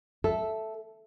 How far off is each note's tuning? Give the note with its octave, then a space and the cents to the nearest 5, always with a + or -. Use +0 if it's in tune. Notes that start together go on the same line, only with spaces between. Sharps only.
A4 -5 E5 +0